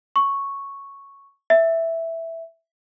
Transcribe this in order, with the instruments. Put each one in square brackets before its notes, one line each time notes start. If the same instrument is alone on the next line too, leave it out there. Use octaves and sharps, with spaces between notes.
[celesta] C#6
E5